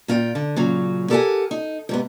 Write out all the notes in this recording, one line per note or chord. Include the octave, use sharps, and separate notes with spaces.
A#2 F4 C5 G5
D3
A#2 C#3 F#3
G4 A4 A#4 C#5 F#5 G#5
D#4
G#2 C3 B3